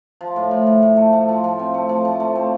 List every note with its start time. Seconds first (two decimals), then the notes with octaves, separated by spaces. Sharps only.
0.21 F3
0.36 A2
0.51 A2
0.67 A2
0.82 A2
0.97 A3
1.13 A3
1.29 F3
1.44 F3
1.59 C4
1.74 A3
1.89 F3
2.05 F3
2.20 A3
2.36 C4